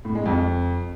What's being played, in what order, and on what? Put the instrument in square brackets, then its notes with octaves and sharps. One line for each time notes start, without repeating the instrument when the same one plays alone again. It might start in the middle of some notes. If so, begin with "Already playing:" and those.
[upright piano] A2
G#3
F2